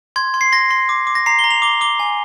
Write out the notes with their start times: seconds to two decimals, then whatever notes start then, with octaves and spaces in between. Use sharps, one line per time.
0.16 C6 G#6
0.34 C6
0.41 C7
0.52 C6 A#6
0.71 C6
0.89 D6
1.07 D6
1.15 A#6
1.26 A#5 C7
1.39 G7
1.44 A#5
1.51 F7
1.62 D6 G7
1.81 D6 G7
1.99 G#5